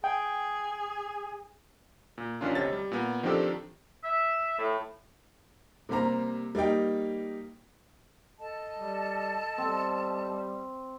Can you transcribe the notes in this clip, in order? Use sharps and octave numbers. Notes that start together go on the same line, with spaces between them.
G#4 G5
A#2
A1 D#3 C#4 D4 F4
D2 C3 C#5 D#5 A6
G3
A#2 B3
D#3 F3 C4 D4 G4 A4
E5
A2
C3 G3 A#3 C5 A#5
G3 A#3 D#4 G5
A4 D#5 A5
G3
G3 C4